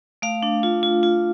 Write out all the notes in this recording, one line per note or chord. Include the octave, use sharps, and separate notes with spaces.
A3 F5
D4
F4
F4
F4